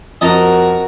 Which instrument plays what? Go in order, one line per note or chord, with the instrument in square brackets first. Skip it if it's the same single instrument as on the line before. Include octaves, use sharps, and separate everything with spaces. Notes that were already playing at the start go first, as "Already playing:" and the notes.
[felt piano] F2 [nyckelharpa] F#4 A#4 [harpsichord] D#5 A5 A#5